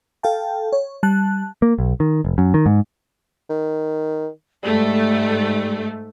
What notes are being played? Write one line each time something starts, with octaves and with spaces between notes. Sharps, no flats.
A4 F5 G5 A5
C#5
G3 A5 F#6
A#3
B1
D#3
F1
F#2
D#3
G#2
D#3
G#2 G3 A3